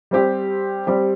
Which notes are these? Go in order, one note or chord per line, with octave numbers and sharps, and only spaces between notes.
G3 C4 G4
G3 C4 G4